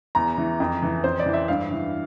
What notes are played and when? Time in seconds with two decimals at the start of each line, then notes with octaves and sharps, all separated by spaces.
0.15 E2 A#5
0.38 E3
0.60 F2
0.83 E3
1.04 F2 C5
1.20 D5
1.26 E3
1.34 E5
1.48 G2 F5
1.71 E3